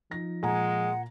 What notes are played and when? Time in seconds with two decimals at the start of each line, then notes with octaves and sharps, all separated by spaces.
0.11 F3 D#4 A#6
0.43 A#2 G#3 F#5 G#5 A#5